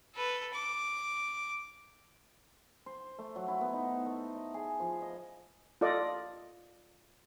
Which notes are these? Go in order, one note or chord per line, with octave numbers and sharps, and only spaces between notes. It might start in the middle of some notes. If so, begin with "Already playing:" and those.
A4 B4
D6
C5
A3
F#3
E4
B3
D#4
C5
A3
D#5
G#4
F3
D#5
F4 A4 D5 D#5